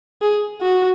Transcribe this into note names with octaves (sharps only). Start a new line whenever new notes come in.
G#4
F#4